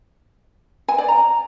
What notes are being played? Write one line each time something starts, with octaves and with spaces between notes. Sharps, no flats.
G#5
D5
A#5